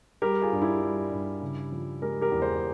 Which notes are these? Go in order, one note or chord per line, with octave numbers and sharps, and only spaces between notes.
G3 G4 A#4
F4 G#4
G2
E4 G4
G3
G2
C#3
F3
G#3 G4 A#4
G4 A#4
E2
G#4 C5